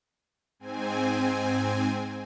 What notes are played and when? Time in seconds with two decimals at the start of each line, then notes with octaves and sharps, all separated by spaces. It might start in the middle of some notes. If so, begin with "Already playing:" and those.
0.59 G#2 C4 G#5